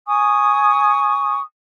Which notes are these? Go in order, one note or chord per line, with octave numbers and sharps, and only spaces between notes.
G#5 C#6 D#6